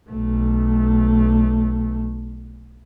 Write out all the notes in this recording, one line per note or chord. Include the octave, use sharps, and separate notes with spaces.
B1 A3